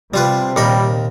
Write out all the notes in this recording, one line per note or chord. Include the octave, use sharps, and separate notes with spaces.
C3 G3 F4 B4
D#2 A#2 G3 A#4 B5